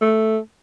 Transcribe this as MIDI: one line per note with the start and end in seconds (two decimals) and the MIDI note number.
0.01 0.38 57